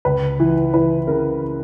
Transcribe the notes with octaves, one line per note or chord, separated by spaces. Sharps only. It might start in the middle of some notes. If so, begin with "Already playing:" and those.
C#2 B4
E3
E3 B4
C#3 A#4